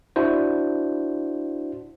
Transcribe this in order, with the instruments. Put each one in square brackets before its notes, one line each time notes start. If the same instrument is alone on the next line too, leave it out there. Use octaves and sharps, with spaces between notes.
[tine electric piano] D4 E4 F#4 C5